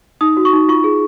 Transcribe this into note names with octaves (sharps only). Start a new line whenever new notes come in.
D#4 D#6
F#4
C#6
D#4
F4 C#6
G#4